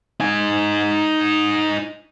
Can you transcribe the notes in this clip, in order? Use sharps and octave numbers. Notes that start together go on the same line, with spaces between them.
D#4 G#5